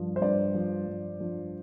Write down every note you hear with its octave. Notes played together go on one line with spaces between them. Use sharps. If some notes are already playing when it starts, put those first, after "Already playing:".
Already playing: G2 F3 D4
C5
G2 D5
F3 D4
G2
F3 D4